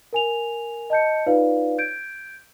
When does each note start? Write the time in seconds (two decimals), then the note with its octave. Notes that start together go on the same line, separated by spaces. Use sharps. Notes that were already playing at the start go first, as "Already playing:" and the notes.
0.13 A#4 G#5 F7
0.90 D#5 A5 G6 C#7
1.26 D#4 F4 B4 C#5 D5 F5
1.78 G6 G#6 D7